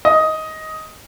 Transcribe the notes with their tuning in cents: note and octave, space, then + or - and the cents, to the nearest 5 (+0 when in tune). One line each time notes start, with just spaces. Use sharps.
D#5 +15